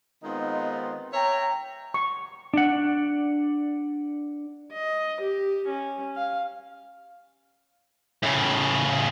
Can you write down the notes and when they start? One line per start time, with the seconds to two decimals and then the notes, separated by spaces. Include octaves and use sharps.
0.24 D#3 G#3 B3 C4 D#4 F4
1.13 C#5 E5 G5 A#5
1.94 C#6
2.54 D4 F#5
4.73 D#5
5.22 G4
5.69 C#4
6.16 F5
8.23 A2 C#3